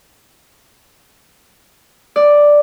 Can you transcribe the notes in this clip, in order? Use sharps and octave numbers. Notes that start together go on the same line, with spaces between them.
D5